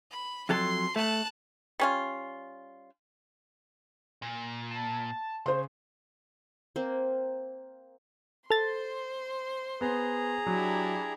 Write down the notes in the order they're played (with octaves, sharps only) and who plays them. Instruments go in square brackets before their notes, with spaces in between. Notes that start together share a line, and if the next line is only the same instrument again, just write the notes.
[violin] B5
[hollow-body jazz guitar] F2 F#3 A4 [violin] C6
[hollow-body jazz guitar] A3 [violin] A5 F#6
[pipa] G3 C#4 F4
[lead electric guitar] A#2
[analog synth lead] A5
[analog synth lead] C#3 [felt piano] C5 C6
[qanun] A#3 C4
[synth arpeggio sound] A4 A6 [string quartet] C5 C6
[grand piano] B3 [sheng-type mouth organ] G#4 A#5
[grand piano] F#3 [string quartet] D4 E4 G4